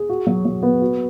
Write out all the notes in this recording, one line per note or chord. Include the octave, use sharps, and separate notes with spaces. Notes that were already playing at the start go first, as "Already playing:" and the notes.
Already playing: G#4
F#4
F#3
F#3
B3
F#4